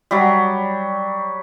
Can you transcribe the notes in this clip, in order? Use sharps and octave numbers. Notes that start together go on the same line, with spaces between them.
F#3 G3